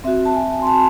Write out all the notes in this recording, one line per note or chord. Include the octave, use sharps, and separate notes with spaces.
C4 F#4 E5
A5
G#5
C6
A5